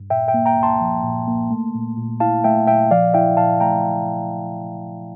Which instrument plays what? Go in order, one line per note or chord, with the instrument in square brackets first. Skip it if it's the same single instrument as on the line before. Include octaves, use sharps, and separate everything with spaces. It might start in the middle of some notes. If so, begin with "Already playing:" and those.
Already playing: [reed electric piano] G2
A#2 E5 G5
E5 G5
A#3
G5 A#5
C2
A5 C6
F3
A#2
A#3
A3
A#2
A#2
E4 F5 A5
A3 E5 G5
A#2 E5 G5
F3 D5 F5
E4 E5 G5
A#2 F5 A5
A3 G5 A#5